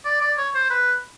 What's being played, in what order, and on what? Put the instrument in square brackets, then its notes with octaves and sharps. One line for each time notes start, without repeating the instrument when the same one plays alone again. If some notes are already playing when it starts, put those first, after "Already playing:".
[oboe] D5
D5
C#5
C5
B4